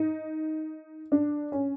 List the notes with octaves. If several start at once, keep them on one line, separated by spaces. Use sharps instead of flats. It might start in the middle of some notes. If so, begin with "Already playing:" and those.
Already playing: D#4
D4
C#4